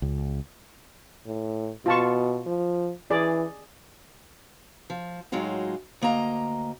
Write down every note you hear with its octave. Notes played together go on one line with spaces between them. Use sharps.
C#2
A2
B2 F4 A5 C#6
F3
E3 G#4 D5
F3
A2 F#3 G#3 D#4 F4 F#4
D2 A#3 D#5 A#5